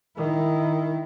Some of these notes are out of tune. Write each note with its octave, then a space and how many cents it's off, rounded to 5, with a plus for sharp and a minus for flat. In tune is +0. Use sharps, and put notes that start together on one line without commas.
D#3 +0 E4 +0